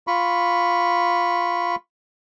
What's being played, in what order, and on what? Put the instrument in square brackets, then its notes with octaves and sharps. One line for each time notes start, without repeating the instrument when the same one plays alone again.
[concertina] F4 B5 C#6